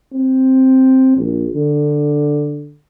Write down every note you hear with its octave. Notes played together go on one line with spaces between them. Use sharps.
C4
A#1
D3